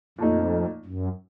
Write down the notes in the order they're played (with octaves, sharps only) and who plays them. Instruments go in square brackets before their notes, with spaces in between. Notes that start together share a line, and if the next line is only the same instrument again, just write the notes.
[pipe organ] F2 [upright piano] A#2 A3 D#4
[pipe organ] F#2